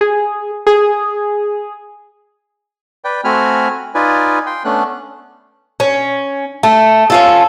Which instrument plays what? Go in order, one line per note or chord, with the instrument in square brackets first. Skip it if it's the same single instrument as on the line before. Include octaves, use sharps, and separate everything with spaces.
[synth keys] G#4
G#4
[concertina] B4 D5 G5
A3 C4 F#4 G#5 B5 F6
D#4 F4 B4 D5 G#5
G5 C6
A3 B3 C#4 D4 F#6
[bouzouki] C#4
A3
C#4 F4 A4